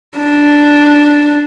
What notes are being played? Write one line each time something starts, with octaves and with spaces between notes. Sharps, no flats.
D4